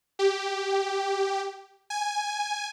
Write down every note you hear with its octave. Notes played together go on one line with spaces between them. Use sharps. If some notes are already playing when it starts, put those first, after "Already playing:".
G4
G#5